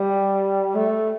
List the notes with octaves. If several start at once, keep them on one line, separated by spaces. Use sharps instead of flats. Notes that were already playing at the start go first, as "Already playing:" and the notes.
Already playing: G3
A3